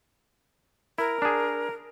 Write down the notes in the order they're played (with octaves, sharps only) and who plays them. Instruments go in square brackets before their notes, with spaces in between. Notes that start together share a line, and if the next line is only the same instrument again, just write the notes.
[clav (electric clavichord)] E4 [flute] A#4
[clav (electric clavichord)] D4 G#4